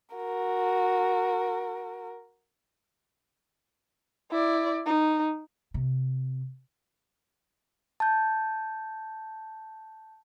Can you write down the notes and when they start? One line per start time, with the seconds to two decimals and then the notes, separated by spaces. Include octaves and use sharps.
0.15 F#4 A#4
4.31 E4 D5
4.86 D#4
5.74 C3
8.00 A5 G6